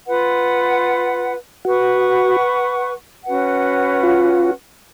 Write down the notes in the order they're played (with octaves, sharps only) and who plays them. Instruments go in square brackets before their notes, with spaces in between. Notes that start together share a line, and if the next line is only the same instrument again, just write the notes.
[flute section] F4 B4 F#5
[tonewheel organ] F#4 [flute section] B4 F#5 C#6
[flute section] C#4 F#4 B4 F#5
[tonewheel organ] F4